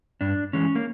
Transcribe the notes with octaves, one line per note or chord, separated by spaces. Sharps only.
G2 D4
E3 G#3 C#4
A#3